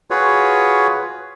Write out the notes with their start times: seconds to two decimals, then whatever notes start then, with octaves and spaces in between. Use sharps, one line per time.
0.11 F4 F#4 G#4 B4 C#5